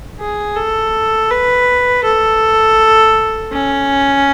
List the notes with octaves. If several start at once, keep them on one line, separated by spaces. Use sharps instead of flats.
G#4
A4
B4
A4
C#4